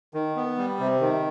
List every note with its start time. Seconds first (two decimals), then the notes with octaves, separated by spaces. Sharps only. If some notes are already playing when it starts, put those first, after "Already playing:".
0.14 D#3
0.36 B3
0.58 G3
0.80 C3
1.00 D#3